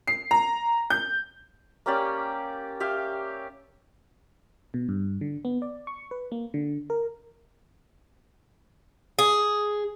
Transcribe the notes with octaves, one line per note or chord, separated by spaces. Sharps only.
C7
A#5
G6
A#3 C#4 G4 D5
G4 E5 F5
B2
G2
D3
B3
D5
C#6
B4
A#3
D3
A#4
G#4